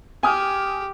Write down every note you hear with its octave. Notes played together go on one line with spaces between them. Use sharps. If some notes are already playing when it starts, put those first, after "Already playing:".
G4 G#5 D#6 F6